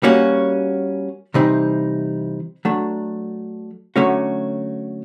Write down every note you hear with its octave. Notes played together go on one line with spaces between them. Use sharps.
G3 A#3 C#4 F#4
C3 E3 G3 C4 D#4
F#3 A3 D4
D3 F#3 A3 C#4 F#4